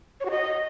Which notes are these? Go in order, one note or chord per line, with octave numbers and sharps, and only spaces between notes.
C#5
F#4
D#5